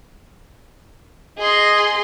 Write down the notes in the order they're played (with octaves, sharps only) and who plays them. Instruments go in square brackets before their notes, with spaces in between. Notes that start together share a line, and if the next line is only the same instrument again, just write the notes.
[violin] G#4 C6 [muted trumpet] D#5